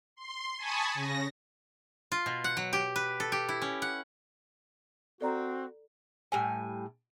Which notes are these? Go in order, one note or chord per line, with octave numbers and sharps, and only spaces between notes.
C6
G#5 A5 B5 C#6 D#6
C#3 A#6
F4
B2
F#5
F#3
G4
B4
A4
G4
E4
C#4
F#5
C4 F#4 A4 D5 A#5
A2 G3 G#5